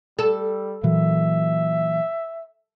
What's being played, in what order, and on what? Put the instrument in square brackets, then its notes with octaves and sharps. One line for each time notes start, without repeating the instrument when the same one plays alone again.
[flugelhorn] G3 [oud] A4
[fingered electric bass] A#2 E3 F#3 [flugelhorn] E5